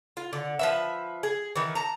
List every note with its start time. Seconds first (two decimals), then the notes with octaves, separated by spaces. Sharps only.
0.17 F4
0.33 D3
0.59 F3 B4 E5
1.23 G#4
1.56 D#3 E3
1.75 A5 A#5